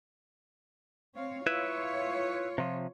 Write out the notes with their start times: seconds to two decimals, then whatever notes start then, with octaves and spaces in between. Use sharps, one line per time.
1.15 C4 C#5 F5
1.47 E4 F4 B4 C#5 E5
2.58 C3 F3